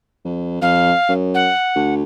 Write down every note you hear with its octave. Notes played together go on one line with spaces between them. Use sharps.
F2
F2 F5
F#2
F#5
D2